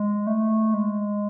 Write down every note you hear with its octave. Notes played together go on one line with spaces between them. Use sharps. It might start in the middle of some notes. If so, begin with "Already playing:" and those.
Already playing: G#3
A3
G#3